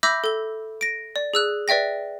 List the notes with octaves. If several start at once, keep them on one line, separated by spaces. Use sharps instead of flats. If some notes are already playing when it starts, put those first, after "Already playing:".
E5 B5 D6 E6 G6 A#6
A4 G7
A#6 D7
D5
G#4 E6 F#6
B4 D5 E5 G5 A#6